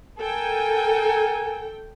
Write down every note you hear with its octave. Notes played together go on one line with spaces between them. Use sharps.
A4 A#4 G5 G#5